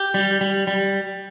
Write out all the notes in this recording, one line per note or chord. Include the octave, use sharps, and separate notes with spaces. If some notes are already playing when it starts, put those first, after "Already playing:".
Already playing: G4
G3
G3
G3